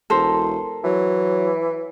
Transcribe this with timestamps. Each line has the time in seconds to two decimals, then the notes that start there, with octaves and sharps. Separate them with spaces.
0.10 E1 A4 A#4 C5
0.84 E3 F#3